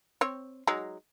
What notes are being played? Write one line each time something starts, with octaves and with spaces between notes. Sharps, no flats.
C4 C#5
F#3 G#3 D#4